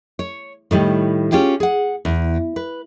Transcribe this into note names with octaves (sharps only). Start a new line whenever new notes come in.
C#5
A2 D#3 G3
C#4 F4 G4 G#4
G#4 F#5
E2
B4